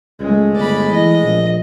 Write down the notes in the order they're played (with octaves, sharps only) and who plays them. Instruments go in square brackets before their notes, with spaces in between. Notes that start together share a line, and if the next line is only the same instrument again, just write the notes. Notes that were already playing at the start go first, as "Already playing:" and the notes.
[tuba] C#2 [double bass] G#3 A3
[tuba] G1 [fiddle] D5 B5
[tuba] E3 [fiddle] D#5
[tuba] A#1